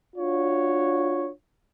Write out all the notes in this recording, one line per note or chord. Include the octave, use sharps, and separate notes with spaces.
D4 F4 F#4 C#5